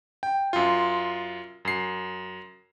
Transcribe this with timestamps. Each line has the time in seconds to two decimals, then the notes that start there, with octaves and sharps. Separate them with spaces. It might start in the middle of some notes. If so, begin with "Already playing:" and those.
0.23 G5
0.53 F#2 F4
1.65 F#2 C7